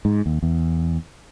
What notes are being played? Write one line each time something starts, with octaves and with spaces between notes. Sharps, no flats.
G#2
D#2
E2